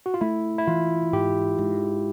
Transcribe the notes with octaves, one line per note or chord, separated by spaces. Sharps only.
F#4
F4
A3 E4
E4
E3 F4
G#2 G4
G#2